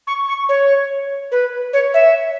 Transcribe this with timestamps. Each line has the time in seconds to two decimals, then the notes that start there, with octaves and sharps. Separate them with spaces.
0.07 C#6
0.29 C#6
0.49 C#5
1.32 B4
1.73 C#5
1.94 E5